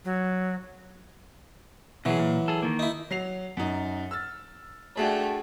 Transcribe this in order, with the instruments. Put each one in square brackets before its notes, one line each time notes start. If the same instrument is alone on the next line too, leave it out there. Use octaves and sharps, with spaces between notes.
[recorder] F#3
[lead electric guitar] B2 G#4 [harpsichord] E3 F#3
[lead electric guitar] A#2
G#4 A4
D#3 A#3
[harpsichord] D#4 E4
[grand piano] F#3 C7 F7
F#2 D#4
E6 F6 A6
[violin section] A3 G5 [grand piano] D4 F#4 G#4